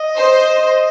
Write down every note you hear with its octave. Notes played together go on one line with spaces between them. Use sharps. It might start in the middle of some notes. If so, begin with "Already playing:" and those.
Already playing: D#5
C5